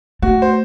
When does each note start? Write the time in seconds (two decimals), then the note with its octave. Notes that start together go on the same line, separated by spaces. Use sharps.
0.22 A3 F#4
0.42 C5